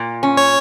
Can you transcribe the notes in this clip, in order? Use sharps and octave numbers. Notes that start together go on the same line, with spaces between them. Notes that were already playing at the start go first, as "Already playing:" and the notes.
Already playing: A#2
C#4
C#5